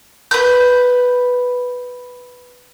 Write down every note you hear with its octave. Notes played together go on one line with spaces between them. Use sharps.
B4 G6